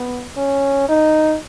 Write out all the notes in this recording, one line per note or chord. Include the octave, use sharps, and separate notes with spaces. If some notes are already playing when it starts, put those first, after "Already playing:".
Already playing: B3
C#4
D#4